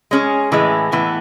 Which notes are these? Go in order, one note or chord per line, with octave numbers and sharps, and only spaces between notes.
G#3 C#4 G#4
A2 E3 G#3
A2 E3 B3